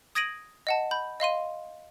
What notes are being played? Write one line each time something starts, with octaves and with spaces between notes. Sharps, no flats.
D#6 G#6 A#6 D7 D#7 F#7
D#5 F#5 A5
B5 G6
D#5 F5 C6 D#7